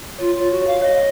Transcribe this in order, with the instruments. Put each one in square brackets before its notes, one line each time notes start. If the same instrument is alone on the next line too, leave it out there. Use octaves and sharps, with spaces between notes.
[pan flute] F4 [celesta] C#5
[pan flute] F4
[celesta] C#5
[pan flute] F#4
[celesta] C#5 [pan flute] F5
[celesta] C#5 [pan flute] D#5